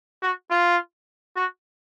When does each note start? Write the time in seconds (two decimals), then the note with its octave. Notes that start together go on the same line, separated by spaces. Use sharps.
0.22 F#4
0.51 F4
1.36 F#4